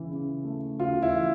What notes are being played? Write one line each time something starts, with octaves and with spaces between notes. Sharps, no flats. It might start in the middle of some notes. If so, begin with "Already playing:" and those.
Already playing: C#3 E3
C#3
A3
C#3 F4
E4
E3